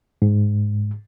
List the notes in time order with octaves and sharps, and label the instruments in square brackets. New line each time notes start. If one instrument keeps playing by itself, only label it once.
[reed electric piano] G#2